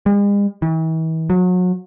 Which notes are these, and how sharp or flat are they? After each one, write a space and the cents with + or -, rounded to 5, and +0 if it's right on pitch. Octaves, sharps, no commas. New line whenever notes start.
G#3 -45
E3 -40
F#3 -30